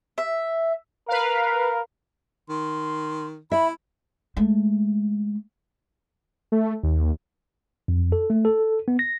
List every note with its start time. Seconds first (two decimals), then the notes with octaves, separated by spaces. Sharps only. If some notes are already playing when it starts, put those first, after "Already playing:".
0.18 E5
1.08 A#4 B4 F5
2.49 D#3 C6
3.52 E4 E5 B5
4.37 G#3 A3
6.52 A3
6.83 D#2
7.88 F2
8.12 A4
8.30 A3
8.45 A4
8.88 B3
8.99 A#6